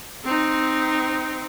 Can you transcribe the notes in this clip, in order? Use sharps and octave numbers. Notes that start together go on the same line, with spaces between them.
C4 D#4